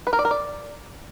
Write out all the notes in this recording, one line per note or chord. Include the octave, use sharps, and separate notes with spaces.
B4
A#4
D5
A#4
D5